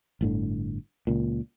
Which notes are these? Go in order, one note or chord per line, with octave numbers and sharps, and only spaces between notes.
G1 A2 D3
C#2 A#2